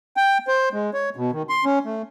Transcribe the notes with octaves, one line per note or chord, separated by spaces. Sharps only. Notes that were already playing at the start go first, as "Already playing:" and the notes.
G5
C5
G#3
C#5
B2
D#3
C6
C#4
A3